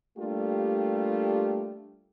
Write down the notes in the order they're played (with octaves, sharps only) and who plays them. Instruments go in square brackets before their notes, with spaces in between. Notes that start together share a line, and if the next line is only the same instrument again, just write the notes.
[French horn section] G3 A3 A#3 D4 F4 G4